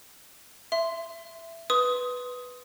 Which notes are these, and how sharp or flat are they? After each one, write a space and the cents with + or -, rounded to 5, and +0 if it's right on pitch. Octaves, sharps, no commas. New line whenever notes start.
E5 +15 C6 -10
B4 +0 C6 +0 D#6 +15